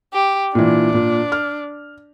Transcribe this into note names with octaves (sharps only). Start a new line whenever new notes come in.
G4
A#2 E3 D4
A#2
F6